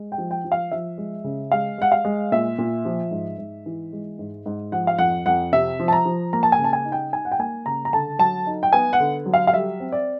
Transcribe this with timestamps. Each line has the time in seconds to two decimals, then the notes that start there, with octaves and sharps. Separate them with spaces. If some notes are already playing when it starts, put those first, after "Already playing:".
Already playing: G#3
0.12 G5
0.18 F3
0.31 G5
0.44 F3
0.52 F5
0.72 F3 E5
0.98 G#3
1.24 C#3
1.52 G#3 F5
1.78 G#3 F#5
1.92 F5
2.05 G#3
2.32 A#2 E5
2.58 A#2
2.85 F3
3.11 G#2
3.38 G#2
3.66 E3
3.93 G#3
4.19 G#2
4.46 G#2
4.72 F3 F#5
4.87 F5
4.98 F2 F#5
5.26 F2 F#5
5.52 C3 E5
5.79 F3
5.88 A5
5.93 A#5
6.05 F3
6.33 A#3 A#5
6.43 A5
6.52 G#5
6.59 C#3
6.64 A5
6.73 G#5
6.85 D#4
6.92 G5
7.13 D#4 G#5
7.25 F#5
7.32 G5
7.39 A#3 G#5
7.66 C#3 A#5
7.85 A#5
7.93 D3 A5
8.19 F#3 A5
8.47 D#4
8.63 G5
8.73 B3 G#5
8.93 F#5
9.00 D3
9.26 F#3
9.34 F5
9.47 F5
9.53 G3 E5
9.80 C4
9.92 D5